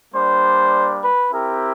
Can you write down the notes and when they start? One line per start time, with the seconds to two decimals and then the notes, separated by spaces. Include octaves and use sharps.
0.14 G3 A#3 D4 C5
1.03 B4
1.32 C4 E4 G4 A#4